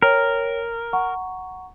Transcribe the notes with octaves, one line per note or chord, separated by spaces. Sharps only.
A#4 C#5 G5
F#5 A#5 C#6